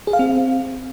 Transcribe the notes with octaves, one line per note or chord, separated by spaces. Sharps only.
G#4
F5
C4